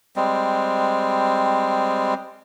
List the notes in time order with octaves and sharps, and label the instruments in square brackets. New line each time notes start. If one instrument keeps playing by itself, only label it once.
[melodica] G3 G#3 C4